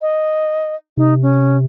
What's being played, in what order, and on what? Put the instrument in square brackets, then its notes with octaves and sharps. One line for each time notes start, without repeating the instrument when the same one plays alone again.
[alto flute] D#5
[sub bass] C3 [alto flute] D#4
[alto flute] C#4